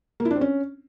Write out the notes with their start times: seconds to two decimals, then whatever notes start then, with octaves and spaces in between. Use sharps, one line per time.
0.20 A#3
0.25 E4
0.31 D4
0.36 C4
0.41 C#4